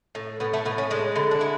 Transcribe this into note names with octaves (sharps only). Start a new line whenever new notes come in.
A2
A2 B3
A3
A2 B3
C#4
G#3 D4
D3 E4
D4
G#3 E4